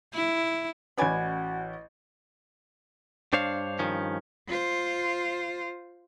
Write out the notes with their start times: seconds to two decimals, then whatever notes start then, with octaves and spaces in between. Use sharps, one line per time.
0.14 E4
0.98 A1 C#4 F#4 B4 D5 G#5
3.33 G2 D4 C5 C#5 F5
3.79 G2 D#3 F3 C#4
4.48 F4 C5